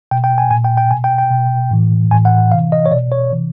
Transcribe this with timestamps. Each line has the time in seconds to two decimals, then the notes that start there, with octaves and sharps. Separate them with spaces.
0.11 B2 G5
0.24 G5
0.38 G#5
0.51 A#2 G#5
0.64 G5
0.77 G5
0.91 B2 G#5
1.04 G5
1.18 G5
1.31 B2
1.71 A2 E3
2.11 A2 E3 G#5
2.25 F#5
2.52 C3 E3 F5
2.72 D#5
2.86 C#5
2.91 B2 D5
3.12 C#5
3.32 C3 E3